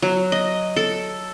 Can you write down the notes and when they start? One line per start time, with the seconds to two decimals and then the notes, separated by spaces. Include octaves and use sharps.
0.02 F#3
0.32 D#5
0.76 A4